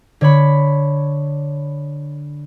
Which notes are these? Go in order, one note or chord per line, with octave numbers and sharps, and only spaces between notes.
D3 C#5 B5